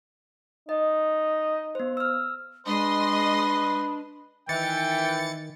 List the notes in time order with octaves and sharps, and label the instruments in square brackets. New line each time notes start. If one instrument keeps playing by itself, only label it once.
[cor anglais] D#4 [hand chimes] D#5
[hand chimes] B3 C5
E6 F6
[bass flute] G#3 [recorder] D4 [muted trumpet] B4 [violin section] D#5 C6
[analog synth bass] D#3 [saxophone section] E3 [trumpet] G5 [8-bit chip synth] A6 C#7